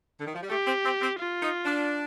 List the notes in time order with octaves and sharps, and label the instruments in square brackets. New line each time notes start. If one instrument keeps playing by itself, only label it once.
[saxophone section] D3
D#3
F3
G3
[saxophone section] A3 [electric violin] G4
[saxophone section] C4
C4
C4
[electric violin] F4
[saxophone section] D#4
D4